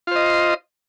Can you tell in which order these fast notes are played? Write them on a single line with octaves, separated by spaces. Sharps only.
F4 C5 D#5